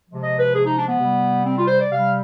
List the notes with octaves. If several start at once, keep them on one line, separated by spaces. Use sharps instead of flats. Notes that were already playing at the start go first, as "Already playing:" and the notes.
C3 F3 G#3
D#5
B4
G#4
D#4
D4
B3
C3 G3
C4
F4
C5
D5
C3 G3 F5